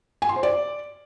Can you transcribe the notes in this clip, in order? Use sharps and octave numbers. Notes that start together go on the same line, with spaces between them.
G#5
C6
C5
D5